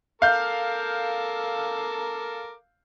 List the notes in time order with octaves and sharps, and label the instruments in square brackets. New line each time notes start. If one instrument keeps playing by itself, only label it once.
[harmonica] A4 A#4 D6 [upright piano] F5 G6